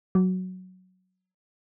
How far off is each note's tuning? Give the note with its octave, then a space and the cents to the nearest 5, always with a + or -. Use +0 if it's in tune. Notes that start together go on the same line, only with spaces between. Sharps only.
F#3 +0